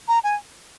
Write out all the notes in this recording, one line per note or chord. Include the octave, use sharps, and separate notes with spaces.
A#5
G#5